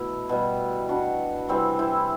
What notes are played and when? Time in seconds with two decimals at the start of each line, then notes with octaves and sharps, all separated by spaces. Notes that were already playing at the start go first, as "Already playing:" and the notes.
Already playing: B2 A3 E4
0.29 B2 G3
0.89 D4 F#4
1.48 C3 E3 G3 C4 E4
1.79 C4 E4